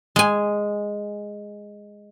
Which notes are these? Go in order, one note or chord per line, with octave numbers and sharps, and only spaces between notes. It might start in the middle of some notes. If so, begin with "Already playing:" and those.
G#3 G#5